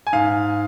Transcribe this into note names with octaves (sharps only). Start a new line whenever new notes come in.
G#5
G#2 F5